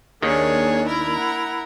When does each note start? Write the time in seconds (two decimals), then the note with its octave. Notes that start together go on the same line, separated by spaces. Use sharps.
0.22 D#2 D#3 A#3 D4 G#4 C#5 G#5
0.87 E4 A#4 A#5
1.17 F#5